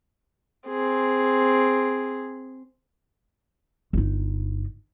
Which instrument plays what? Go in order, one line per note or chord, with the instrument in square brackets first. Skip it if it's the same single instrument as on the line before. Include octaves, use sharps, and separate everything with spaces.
[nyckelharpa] C4 G#4
[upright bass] G1 D#4